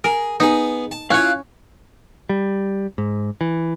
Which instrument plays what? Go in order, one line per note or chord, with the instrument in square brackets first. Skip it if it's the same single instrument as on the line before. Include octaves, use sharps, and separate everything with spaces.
[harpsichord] G#4 [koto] A#4
[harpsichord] B3 G#4 [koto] D#4
[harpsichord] A5
[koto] C#4 C#5 [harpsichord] E4 F4 [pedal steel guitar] F5 F#6
[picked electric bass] G3
G#2
E3